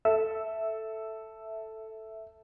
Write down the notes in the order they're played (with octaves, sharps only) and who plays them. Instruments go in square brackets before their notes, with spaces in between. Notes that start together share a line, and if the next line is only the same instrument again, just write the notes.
[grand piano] A4 [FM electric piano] E5